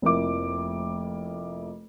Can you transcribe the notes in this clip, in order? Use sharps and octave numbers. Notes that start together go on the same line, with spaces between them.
F1 F2 A#3 E4 D6